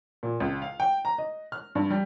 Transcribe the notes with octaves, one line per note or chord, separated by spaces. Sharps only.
A#2
C#2
F5
G5
A#5
D#5
F6
G2
G3